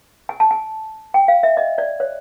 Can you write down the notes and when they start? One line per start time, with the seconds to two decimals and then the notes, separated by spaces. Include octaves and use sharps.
0.29 G#5
0.40 A5
0.51 G#5
1.14 G5
1.28 F5
1.43 E5
1.57 D#5
1.78 D5
2.00 C#5